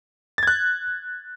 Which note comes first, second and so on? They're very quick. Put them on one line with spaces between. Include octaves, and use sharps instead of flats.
A6 G#6 F#6